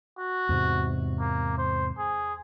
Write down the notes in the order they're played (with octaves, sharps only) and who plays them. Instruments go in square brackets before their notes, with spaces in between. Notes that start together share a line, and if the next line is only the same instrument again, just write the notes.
[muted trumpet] F#4
[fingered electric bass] E2 G#2 C3
[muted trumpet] A#3
C5
G#4